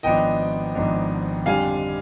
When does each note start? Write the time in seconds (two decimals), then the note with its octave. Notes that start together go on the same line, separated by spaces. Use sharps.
0.03 G#1 G#2 F3 B3 D4 D#5 G5
0.75 G#1 G#2 F3 B3 D4
1.46 F2 D3 G3 D4 F5 G#5